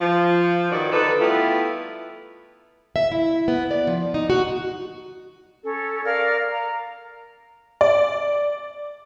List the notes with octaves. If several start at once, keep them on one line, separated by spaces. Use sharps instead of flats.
F3
G2 D#3 F#4 D5
D3 D#4 A4 B4
G3 A3 B3 E4 F4
E5
E4
B3
D5
F3
D#4
F#4
C#4 A4
A#4 D5 F5 F6
A#5
D5